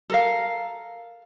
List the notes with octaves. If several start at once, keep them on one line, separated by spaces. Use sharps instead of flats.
A4 A#4 F5